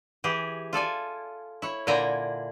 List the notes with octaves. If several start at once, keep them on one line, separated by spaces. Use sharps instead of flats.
E3 G4 G#4
F4 A4 D5 G#5
E4 C#5
A#2 D3 E4 G5 G#5 A#5